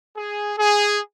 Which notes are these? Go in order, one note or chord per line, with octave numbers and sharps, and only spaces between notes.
G#4
G#4